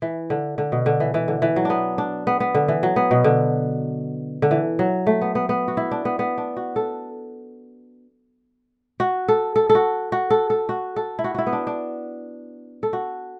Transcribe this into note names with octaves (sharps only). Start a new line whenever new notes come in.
E3
D3
D3
B2
D3
E3
E3
D3
E3
F#3
B3 D4
D4
B3
B3
D3
E3
F#3
B3
B2
D3
D3
E3
F#3
A3
B3
B3
B3
F#4
E4
D4
B3
B3
D4
F#4
A4
F#4
A4
A4
A4
F#4
F#4
A4
A4
F#4
A4
E4
F#4
E4 F#4
B3
D4
D4
A4
F#4